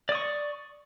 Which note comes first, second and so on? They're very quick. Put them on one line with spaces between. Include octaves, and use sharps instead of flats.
D5 D#6 C#6